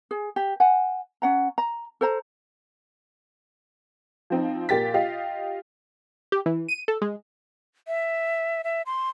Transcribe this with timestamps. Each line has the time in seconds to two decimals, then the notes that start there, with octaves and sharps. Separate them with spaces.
0.11 G#4
0.36 G4
0.60 F#5 G#5
1.22 C#4 F#5 A#5
1.58 A#5
2.01 A4 C5 A#5
4.30 F3 C4 D#4
4.69 A#2 A#3 G4 A6 B6
4.94 F4 G4 D#5 F5
6.32 G4
6.46 E3
6.68 D#7
6.88 A4
7.02 G#3
7.88 E5
8.64 E5
8.86 C6